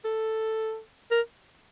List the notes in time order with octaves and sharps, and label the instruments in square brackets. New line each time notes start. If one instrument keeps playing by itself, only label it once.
[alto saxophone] A4
A#4